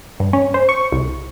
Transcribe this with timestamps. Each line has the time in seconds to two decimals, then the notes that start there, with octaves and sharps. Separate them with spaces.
0.20 G2
0.33 C#4
0.54 C5
0.69 C#6
0.92 C2